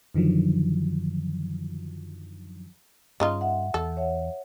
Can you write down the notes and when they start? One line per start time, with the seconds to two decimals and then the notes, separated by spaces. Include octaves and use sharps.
0.15 F#2 D3 D#3 F3 F#3
3.20 G2 C#3 D#4 F4
3.41 E5 F#5
3.74 E2 A4
3.97 C#5 E5 F#5